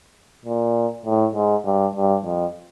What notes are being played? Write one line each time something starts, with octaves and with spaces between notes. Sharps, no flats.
A#2
A2
G#2
G2
G2
F2